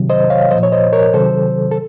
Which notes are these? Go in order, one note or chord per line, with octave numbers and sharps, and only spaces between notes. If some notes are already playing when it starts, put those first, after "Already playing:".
Already playing: C3 D#3 F#3
C5 D#5
C#5 F5
A#2 F3 C5 D#5
C#5
C5 D#5
A#4 C#5
C3 D#3 F#3 A4 C5
A4